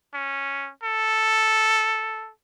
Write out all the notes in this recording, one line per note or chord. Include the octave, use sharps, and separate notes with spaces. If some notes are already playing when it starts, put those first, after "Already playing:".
C#4
A4